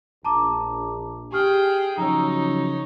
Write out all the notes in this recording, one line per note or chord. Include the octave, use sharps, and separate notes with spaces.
A#1 A5 A#5 D6
G4 G#4 G5 F6
C#3 F3 F#3 D#4 C#5 A#5 E6